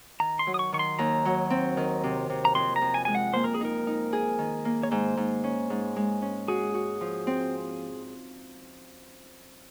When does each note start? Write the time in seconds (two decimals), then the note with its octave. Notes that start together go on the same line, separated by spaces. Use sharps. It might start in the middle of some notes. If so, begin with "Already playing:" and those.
0.20 D#3 A#5
0.39 C6
0.47 F#3
0.54 D#6
0.59 C#6
0.72 D#3 C#6
0.79 C6
0.99 D#2 A#5
1.25 F#3
1.50 C4
1.77 D#3
2.04 C3
2.30 C3
2.45 A#5
2.55 F2 C6
2.76 A#5
2.81 F2
2.94 G#5
3.05 G#3 G#5
3.15 F#5
3.34 A#3 C5
3.44 A#4
3.54 G#4
3.61 D#4 A#4
3.87 D#4
4.13 G#4
4.39 D#3
4.65 A#3
4.83 C#5
4.91 G#2 C5
5.17 G#2
5.44 C#4
5.70 G#2
5.96 G#3
6.22 C#4
6.48 F#4 G#4
6.74 F#4
7.01 F3
7.27 C4